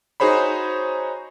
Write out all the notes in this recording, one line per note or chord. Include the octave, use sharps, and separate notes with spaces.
D#4 F#4 G#4 C5 C#5 B5